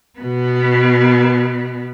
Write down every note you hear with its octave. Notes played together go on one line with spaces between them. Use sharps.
B2 B3